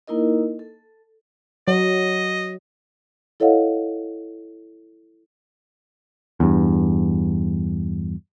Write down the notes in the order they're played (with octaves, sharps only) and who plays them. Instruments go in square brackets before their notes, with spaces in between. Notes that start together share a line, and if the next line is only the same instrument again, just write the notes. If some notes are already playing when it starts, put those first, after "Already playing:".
[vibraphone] A#3 D#4 E4 A#4 D#5
A4
[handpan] F#3 [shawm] D#5
[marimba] E4 A4 C#5 D#5 F5 F#5
[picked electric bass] E2 G2